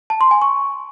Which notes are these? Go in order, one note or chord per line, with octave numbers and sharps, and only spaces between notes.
A5
C6
G#5
C#6